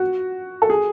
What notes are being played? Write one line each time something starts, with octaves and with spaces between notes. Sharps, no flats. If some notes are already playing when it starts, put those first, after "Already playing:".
Already playing: F#4
A4
G#4